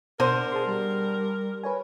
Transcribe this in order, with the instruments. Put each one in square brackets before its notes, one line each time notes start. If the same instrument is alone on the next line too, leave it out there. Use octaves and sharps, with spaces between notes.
[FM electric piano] B2 [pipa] D3 C5 [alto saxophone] A#4
[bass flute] G#4 [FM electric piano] A5 C6
[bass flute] G3
[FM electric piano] B4 C#5 G#5